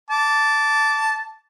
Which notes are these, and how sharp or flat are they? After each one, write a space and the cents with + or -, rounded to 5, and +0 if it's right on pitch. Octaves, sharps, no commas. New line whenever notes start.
A5 +0 D6 -20